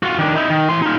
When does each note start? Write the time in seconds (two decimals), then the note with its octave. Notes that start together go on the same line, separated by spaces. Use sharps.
0.03 F4 F#4
0.19 D#3 D4
0.36 D#4 E4
0.50 D#3
0.69 E3 C6
0.82 D#4 F4